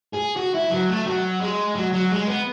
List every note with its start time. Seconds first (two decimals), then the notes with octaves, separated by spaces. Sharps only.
0.13 G#4
0.36 F#4
0.54 E4
0.71 F#3
0.89 A3
1.06 F#3
1.40 G#3
1.75 F#3
1.93 F#3
2.10 G#3
2.27 B3